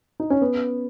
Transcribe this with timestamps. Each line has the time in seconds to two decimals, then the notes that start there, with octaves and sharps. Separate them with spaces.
0.20 D#4
0.30 C#4
0.41 B3